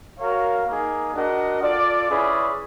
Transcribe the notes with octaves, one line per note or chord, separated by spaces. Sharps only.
F#4 A#4 C#5 F5
A#3 D#4 G#4
D4 F#4 A#4 D#5 F#5
F4 A4 D5
C#4 E4 G#4 B4 D5